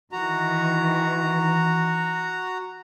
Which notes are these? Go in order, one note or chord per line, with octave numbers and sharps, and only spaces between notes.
D#3 E3 F#4 A#5